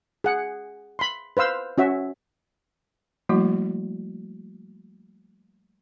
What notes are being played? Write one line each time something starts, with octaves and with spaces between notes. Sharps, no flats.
G#4 F#5
B5 C6
B4 C5 F5 E6
C#4 F#4 E5
F3 G3 A3 A#3 E4 F#4